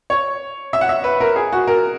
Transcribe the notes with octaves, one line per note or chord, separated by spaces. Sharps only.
C#5
E5
F#5
E5
B4
A#4
G#4
F#4
A#4